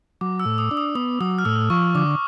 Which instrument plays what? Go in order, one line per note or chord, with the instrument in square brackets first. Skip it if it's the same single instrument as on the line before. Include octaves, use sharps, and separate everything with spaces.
[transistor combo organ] F#3 [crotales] D6
[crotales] E6
[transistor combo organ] A2
[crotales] D#6
[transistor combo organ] D4
[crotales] D#6
[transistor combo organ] B3 [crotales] D#6
[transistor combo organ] F#3 [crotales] D#6
[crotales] F6
[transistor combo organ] A2 [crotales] E6
[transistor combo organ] F3 [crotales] C#6
[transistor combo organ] D3 [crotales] D6